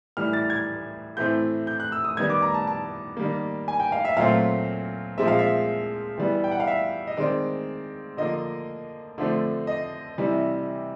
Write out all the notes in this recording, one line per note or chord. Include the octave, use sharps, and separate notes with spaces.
A2 E3 G3 F6
A6
G#6
A2 E3 A3 C4 G6
G6
F#6
E6
D#6
D#3 G3 B3 G#6
D6
A#5
A5
A5
D#3 G3 A#3
G#5
G5
F5
E5
A#2 F#3 A3 C4 F5
A#2 F3 G#3 C4 E5
F5
E5
E3 G3 B3
G5
F#5
F5
E5
D#5
D#3 G#3 C4 D5
D3 F3 A#3 D#5
D3 F3 A3 C4
D#5
C3 E3 G3